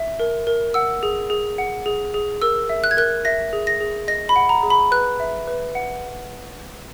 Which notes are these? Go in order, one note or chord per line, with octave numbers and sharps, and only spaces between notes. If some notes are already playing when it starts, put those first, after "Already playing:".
Already playing: E5
A#4
A#4
F#5 E6
G#4
G#4
F#5
G#4
G#4
A#4 E6
E5
F#6
G#6
A#4 F#6
E5 A#6
G#4
A#6
G#4
D#5 A#6
B5
F#5
A#5
G#4
B5
B4 F#6
E5
B4
F#5